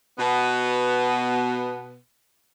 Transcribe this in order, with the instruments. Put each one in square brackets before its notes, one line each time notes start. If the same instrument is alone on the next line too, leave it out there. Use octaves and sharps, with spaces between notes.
[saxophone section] B2 B3